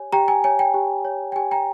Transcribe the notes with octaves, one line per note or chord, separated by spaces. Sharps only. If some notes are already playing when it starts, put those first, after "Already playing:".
Already playing: G4 C#5 G#5
G4 G5 A#5
G#5
C#5 G#5
G5
G4
C#5
G5
G4 G#5
G5 A#5